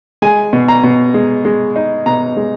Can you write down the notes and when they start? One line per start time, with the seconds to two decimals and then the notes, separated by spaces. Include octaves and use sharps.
0.22 G#3 G#5
0.53 B2
0.68 A#5
0.84 B2
1.14 G#3
1.45 G#3
1.76 D#4
2.06 B2 A#5
2.37 G#3